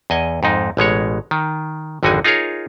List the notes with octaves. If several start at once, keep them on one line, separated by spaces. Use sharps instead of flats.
E2 D#5 G#5
F2 G#2 D#4
A1 B2 G#3 C#5
D#3
G#1 F2 D3 D#4 F#4 G#5
D#4 F4 G#4 A#4 C#5